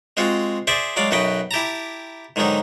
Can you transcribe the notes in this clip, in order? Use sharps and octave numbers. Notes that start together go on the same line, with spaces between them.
G#3 C4 F4 F#4
G#4 C5 D5 E5
F#3 G#3 D5 F5
B1 F#2 F#4 B4 D#5 G5
E4 G4 A5 A#5
G#2 D3 D#3 F#3 D#4